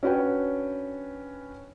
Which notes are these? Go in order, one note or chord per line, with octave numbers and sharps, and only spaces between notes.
C#4 D4 F#4 B4 C#5 G5